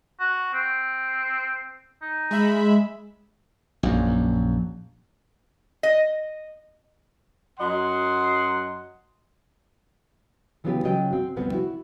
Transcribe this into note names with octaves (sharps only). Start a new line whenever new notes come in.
F#4
C4
D#4
G#3 E5 B5
A#1 F#2
D#5
F#2 F#3 D#5 F#5 C6
C#3 E3 F#3 B3 F4 G4
C#3 F#3 F4 D#5 G5
C4 F#4
D2 C3 F3 G3 B3 C4
E4 F#4